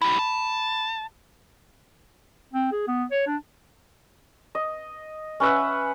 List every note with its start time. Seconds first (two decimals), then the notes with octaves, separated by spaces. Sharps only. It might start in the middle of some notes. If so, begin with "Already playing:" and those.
0.02 E4 G4 B5
0.19 A5
2.53 C4
2.72 G#4
2.87 B3
3.11 C#5
3.27 D4
4.55 D#5
5.40 C#4 B4 E5 F#5